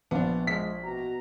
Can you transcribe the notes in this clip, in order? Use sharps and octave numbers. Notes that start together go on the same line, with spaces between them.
A#1 B3 D4 F4
G#3 B6
B2 F#4 A#5